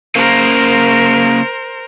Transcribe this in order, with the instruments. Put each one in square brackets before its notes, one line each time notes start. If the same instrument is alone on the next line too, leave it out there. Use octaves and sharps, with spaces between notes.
[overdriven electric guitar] C#3 A#3 [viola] A#4 C5